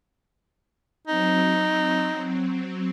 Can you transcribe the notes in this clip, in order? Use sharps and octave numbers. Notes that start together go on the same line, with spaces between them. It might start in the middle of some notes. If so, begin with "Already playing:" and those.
F#3 C4 D#4